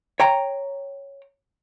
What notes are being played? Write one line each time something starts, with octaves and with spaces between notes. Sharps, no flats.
C#5 G5 A#5